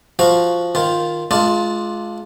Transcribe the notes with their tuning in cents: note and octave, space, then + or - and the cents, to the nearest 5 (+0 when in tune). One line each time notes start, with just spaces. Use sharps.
F3 +0 F#4 +0 F5 +15
D#3 +0 F4 +0
G#3 +35 D4 +0 F4 +0